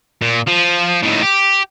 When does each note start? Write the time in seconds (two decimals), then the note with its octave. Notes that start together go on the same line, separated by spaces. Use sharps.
0.22 A#2
0.47 F3
1.03 A2 D#3
1.23 G4